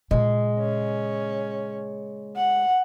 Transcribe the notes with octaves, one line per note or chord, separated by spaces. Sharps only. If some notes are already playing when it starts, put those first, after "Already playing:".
A#2 C#3 G#3
C#4
F#5